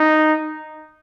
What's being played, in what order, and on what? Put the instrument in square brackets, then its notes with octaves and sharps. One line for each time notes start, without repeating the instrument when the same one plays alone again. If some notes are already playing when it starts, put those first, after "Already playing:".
Already playing: [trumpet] D#4